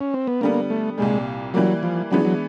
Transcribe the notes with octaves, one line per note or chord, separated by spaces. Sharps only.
C#4
C4
B3
D3 G3 A#3 B3
A3
C2 A#2 G3 G#3
E3 F#3 G3 A#3
F3
E3 F#3 G#3 B3 D4
F#3